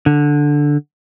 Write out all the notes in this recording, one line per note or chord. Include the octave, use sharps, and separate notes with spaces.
D3